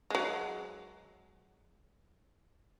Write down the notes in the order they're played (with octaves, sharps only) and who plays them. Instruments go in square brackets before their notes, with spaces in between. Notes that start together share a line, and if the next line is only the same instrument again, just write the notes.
[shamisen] F#3 G#3